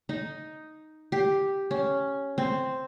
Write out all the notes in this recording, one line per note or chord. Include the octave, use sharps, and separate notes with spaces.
D#4
G4
C#4
C4